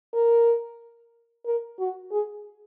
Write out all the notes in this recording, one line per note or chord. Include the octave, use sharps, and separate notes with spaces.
A#4
A#4
F#4
G#4